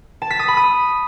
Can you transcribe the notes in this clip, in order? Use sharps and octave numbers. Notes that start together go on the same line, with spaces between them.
A5
B6
D#6
B5
D#6